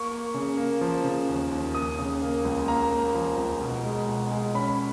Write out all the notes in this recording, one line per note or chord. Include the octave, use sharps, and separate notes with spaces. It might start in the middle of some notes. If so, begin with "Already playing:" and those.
Already playing: A#3 C#6
A#3
C#3
A#3
F3
C#3
D#2
D#2
A#3 D#6
C#3
A#3
C#2
A#3 A#5
A#3
F3
C#2
B2
G#3
B2
G#3
C#4 B5